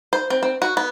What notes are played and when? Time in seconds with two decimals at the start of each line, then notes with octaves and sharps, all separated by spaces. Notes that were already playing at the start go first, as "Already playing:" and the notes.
0.13 C5
0.30 C4
0.43 C4
0.62 F#4
0.77 B3